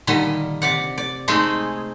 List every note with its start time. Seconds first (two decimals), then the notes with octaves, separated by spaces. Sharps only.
0.07 A#2 D3 D#3 G3 D#5
0.62 C3 D5 F#5
0.98 D5
1.28 G#3 A3 C4 D#4 G#4